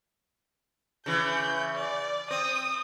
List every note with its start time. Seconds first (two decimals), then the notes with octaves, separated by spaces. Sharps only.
1.06 C#3 E3 G6
1.75 D5
2.31 C4 D#6